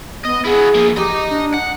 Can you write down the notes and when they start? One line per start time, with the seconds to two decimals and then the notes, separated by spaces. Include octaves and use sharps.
0.25 B3 D#5
0.44 E4 F#4 G#4
0.75 F3 A#3
0.97 G4 D#5 A#5
1.30 D4
1.54 F#5